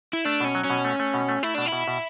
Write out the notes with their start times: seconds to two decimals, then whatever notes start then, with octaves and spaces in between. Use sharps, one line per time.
0.13 E4
0.25 A3 D4
0.40 B2 C#4
0.55 F#3
0.64 C#4
0.70 B2
0.85 A3
0.99 A3
1.14 B2
1.29 A3
1.43 A3 E4
1.55 B2 D4
1.66 E4
1.72 B2
1.88 B2